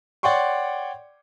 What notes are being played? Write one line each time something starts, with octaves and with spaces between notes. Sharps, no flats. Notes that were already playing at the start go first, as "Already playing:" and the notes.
C#5 D5 F#5 G5 C6 C#6